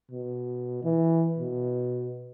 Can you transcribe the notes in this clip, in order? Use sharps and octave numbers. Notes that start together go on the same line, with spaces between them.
B2
E3
B2